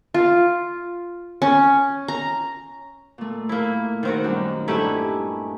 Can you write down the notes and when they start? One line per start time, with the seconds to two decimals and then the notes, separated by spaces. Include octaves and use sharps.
0.14 F4
1.42 C#4
2.08 A#5
3.18 A#2 A3
3.49 A#3 E4
4.03 D#3 C4 F#4
4.24 F#2 G3 D#4
4.68 G2 A3 E4 G4 G#5 A#5